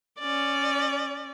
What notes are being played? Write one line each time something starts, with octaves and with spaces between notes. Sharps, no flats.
C#4 D5